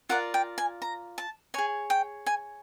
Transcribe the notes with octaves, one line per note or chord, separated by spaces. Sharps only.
F4 A#4 D5 F#5
G5
G#5
A#5
A5
G#4 C#5 G#5
G5
G#5